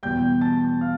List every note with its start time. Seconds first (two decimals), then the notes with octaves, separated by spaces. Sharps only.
0.03 E2 B2 G3 G5 G6
0.41 A5 A6
0.81 F5 F6